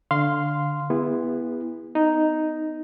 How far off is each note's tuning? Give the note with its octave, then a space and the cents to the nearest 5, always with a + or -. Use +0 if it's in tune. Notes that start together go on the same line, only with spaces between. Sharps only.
D3 +0 F5 +0 C6 -10
B3 -5 E4 +0 G#4 -45
B3 +35 D#4 +0